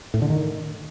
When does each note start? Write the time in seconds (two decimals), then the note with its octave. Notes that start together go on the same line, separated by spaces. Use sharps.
0.14 A2
0.22 D3
0.30 D#3